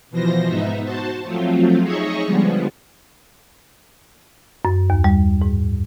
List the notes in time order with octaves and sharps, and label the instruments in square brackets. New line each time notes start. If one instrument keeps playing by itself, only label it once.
[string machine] B2 E3 F3 C5 A#6
G#2 B3 D#4 E5
F#4 C5 A5
F3 F#3 A3 C4 F4
D#4 G#4 C#5 D#5 E5 C#6
D3 F3 G3 G#3 B3
[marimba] F#2
D#2
G3
G#2